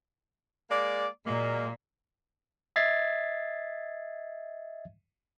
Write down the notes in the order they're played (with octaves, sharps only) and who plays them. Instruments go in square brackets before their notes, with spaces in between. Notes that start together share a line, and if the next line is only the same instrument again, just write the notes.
[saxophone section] G#3 A#3 D5
[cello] A#2 [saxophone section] F#3 G#3 A#3
[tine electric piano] D#5 E5 G#6 A6 B6 C7